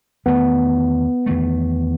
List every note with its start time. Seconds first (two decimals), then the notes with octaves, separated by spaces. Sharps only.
0.26 E2 D#3 A3 B3
1.26 E2 D#3 A3